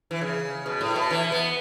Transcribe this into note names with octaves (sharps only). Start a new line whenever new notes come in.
E3
C#3
B2
A2
B2
E3
B3